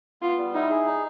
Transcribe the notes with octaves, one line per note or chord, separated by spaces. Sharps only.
B3 F4
G3
D#4 E4
G#4
D#4